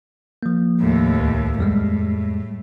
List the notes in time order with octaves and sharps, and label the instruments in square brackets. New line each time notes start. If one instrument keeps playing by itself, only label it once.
[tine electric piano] F3 A#3
[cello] D#2 A2
[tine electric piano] C#2
[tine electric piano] F2 G3 G#3 [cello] A2